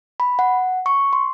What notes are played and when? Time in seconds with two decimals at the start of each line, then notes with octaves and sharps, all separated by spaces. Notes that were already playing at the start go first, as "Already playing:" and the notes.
0.20 B5
0.39 F#5
0.86 C#6
1.13 C6